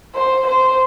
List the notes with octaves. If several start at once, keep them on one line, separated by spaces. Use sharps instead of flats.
C5
C5